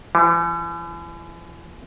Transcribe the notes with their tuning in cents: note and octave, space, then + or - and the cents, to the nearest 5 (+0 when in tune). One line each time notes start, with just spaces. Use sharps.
E3 +40